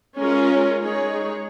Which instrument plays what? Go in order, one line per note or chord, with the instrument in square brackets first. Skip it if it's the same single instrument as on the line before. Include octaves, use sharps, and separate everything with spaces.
[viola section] G#3 C#4 F4 A#4 C#5
G#3 D#4 G#4 C#5